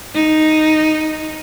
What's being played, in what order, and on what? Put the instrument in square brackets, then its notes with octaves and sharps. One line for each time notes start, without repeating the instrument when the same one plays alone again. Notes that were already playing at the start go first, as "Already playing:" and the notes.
[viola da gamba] D#4